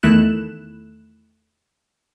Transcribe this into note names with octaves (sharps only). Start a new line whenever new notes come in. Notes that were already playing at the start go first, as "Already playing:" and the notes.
E2 D#3 A3 E4 F#6 E7